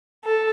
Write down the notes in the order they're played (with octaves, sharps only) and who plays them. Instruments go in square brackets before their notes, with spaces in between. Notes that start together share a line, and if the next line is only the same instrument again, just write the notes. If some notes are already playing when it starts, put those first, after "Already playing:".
[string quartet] A4